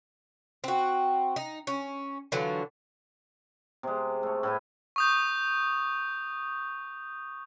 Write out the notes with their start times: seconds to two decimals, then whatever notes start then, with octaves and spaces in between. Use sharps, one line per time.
0.64 C4 F#4
1.36 D#4
1.67 C#4
2.32 D3 E3 F#3 F4
3.83 C3 G#3
4.23 A3 C#5
4.43 A2 E4 B4
4.96 C#6 D#6 G6